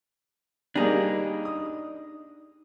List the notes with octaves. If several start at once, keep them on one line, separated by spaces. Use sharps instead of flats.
G3 A#3 D4 D#4 G#4
D#6